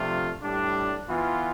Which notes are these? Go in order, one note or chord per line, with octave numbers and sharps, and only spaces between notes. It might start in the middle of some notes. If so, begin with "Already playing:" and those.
Already playing: C3 F3 A3 D4 F4
A2 G3 D4
E3 B3 F4